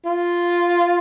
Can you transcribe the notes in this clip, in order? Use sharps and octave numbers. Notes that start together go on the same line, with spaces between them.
F4